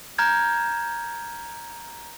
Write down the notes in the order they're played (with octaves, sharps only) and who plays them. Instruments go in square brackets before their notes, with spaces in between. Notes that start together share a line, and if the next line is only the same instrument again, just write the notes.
[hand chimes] A#5 F6 G6 G#6